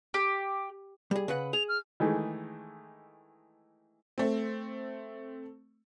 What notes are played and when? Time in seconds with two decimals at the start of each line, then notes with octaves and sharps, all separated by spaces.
0.14 G4
1.11 G3 G#4
1.28 C#3 B4 F#5
1.53 G#4 F7
1.69 F6
2.00 D#3 E3 G#3 A3 G#4
4.18 A3 C4